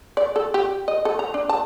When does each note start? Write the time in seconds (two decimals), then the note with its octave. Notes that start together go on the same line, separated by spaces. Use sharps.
0.17 D5
0.36 A4
0.54 G4
0.88 D#5
1.05 A4
1.19 A#5
1.34 D4
1.49 A5